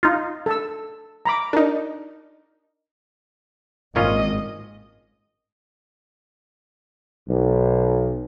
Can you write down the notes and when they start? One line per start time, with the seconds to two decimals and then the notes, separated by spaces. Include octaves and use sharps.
0.03 D#4 F4
0.46 A4 A5 E6
1.25 A#5 B5 D6
1.53 D4 D#4 A#4
3.96 G#1 A#2 C#4 F4 D#5
7.29 B1